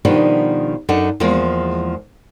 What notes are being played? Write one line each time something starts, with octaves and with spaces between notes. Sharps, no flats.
B2 D#3 F3 G3 B3 D4
F#2 D4 D#4 A4 F#5
E2 F3 G#3 A#3